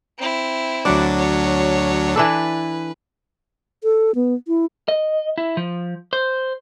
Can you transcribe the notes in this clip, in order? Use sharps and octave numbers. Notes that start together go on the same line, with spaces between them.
C4 E4
D2 F#3 D4 D5 F#5
C#5
E3 D4 A4 B4
A4
B3
E4
D#5
E4
F3
C5